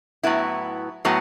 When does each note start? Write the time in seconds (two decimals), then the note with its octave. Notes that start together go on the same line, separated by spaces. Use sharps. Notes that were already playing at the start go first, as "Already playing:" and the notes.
0.23 A2 F#3 B3 E4
1.05 A2 F#3 B3